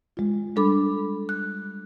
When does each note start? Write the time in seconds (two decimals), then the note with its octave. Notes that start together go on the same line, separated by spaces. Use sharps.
0.17 G#3 F4
0.56 G3 D4 A4 B5 D6
1.29 F#6